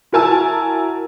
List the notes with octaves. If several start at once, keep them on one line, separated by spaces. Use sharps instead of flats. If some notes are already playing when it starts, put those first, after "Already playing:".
E4 F#4 A#4 G#5 A5 E6